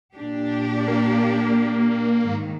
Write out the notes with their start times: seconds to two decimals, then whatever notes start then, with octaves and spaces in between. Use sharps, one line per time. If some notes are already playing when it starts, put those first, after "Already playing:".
0.14 A#2 D4 G4
0.88 A#3
2.23 G#2 D#3